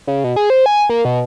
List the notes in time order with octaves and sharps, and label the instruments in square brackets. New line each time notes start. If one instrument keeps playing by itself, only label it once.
[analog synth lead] C#3
B2
G#4
C5
G#5
A#3
B2